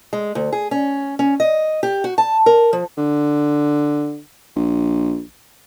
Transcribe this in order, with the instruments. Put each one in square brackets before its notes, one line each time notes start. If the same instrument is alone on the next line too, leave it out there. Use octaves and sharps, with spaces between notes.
[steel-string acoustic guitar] G#3
D2
G#4
C#4
C#4
D#5
G4
F#4
A5
A#4
F3
[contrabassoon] D3
A#1